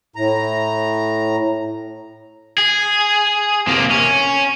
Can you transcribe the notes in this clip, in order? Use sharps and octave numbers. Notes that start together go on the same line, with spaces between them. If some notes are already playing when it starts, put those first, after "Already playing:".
A2 A#5
G#4
C3 A#3
C#4